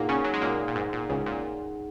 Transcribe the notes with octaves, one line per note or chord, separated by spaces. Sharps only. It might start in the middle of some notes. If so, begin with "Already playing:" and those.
Already playing: A#2 A#3 D#4 G#4 F#5
C#3 C#4
F#3
G#3
A#2 A#3
A#2
G#2
A#2
C#2 C#3
A#2